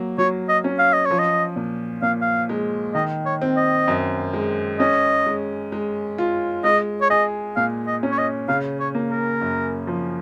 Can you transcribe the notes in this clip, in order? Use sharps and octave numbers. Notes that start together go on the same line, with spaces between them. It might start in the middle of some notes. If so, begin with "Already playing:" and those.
Already playing: F#3 A#3
F#3 C#5
D#5
C#4
F5
D#5
C#5
F3
D#5
A#2
A#2 F5
F5
G#3
D#3 D#5
C#5
C4
D#5
F#2
G#3
C#4 D#5
G#3
G#3
F4
G#3 D#5
C#5
G#4 D#5
A#2 F5
D#5
C#4
C#5
D#5
C#3 F5
C#5
A#3
A#4
F#2
F3